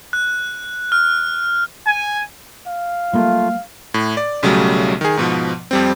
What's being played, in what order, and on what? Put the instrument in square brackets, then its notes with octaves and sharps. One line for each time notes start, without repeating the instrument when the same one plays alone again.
[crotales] F#6
F6
[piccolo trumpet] G#5
[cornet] F5
[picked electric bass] F#3 G3 A#3 [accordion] A3 F4
[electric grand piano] A2
D5
B1 C#3 F#3 G3 A3
D#3 G#4
G#2 B2 F3
F2 G3 C4